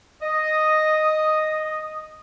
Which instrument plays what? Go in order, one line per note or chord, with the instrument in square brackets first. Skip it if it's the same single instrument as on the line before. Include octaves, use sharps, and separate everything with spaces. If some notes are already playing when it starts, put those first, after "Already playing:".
[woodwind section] D#5 D#6